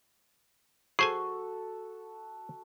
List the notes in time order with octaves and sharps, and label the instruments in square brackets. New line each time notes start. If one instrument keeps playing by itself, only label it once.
[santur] F#4 A4 [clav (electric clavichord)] G#4 C5 G#5 [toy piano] C#6